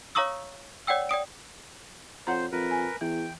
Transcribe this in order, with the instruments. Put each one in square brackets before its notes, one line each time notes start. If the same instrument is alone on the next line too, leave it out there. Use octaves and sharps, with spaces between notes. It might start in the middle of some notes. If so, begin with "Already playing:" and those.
[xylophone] C#5 F5 A#5 C#6 D#6 E6
C#5 D5 F#5 G5 E6
D5 G5 D#6 D7
[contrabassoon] F2 [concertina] C5 [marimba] C#5 F#5 A#5
[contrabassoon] F2 [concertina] A#4 B4
[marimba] G#5
[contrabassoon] E2 [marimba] E3 [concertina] G5